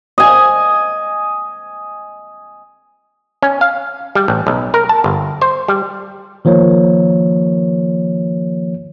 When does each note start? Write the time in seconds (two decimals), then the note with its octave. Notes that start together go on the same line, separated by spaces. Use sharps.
0.18 D#5 G#5
3.42 C#4
3.61 F5
4.15 G3
4.28 A1
4.47 B1
4.74 A#4
4.89 A5
5.04 G1
5.42 C5
5.68 G3
6.45 D#3 F3 A#3 C#5